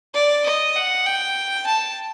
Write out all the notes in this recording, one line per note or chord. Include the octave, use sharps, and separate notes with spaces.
D5
D#5
F#5
G5
A5